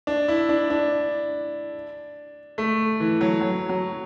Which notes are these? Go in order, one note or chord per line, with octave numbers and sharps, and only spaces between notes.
D4
E4
D4
D4
A3
E3
F#3
F#3
F#3